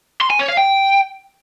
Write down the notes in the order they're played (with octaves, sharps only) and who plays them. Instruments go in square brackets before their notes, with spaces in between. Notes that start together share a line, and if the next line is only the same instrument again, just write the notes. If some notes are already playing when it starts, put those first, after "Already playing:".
[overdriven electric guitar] C6
G#5
C#5
F5
G5